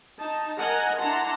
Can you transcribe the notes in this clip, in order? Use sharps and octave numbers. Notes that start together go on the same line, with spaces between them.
D#4 A5
A#4 D#5 F#5 G#5 A#5
D4 E4 F#5 A5 A#5 C6